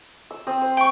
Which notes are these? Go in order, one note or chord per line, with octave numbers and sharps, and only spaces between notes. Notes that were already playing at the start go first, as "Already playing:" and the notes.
E6
C4 D#6
C5
G5 C#6